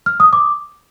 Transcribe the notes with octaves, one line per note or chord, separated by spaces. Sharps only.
F6
D#6
D6